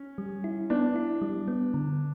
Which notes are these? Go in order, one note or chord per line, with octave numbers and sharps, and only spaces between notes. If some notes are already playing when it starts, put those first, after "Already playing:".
Already playing: C#4
G3
E4
B3 D4
E4
G3
B3
D3